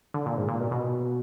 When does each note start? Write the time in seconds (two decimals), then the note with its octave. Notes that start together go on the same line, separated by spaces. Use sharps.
0.14 D3
0.26 A#2
0.37 G#2
0.48 A#2
0.60 B2
0.71 B2